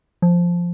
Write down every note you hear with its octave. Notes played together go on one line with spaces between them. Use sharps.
F3